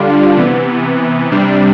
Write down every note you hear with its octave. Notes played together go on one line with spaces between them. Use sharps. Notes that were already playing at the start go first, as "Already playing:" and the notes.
Already playing: D3 G3 D4 F4
C3 E3 B3
C3 G3 D4